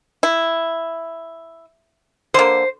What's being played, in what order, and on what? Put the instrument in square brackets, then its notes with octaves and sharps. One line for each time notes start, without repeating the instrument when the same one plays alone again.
[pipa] E4
[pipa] D3 A#3 [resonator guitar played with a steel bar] C5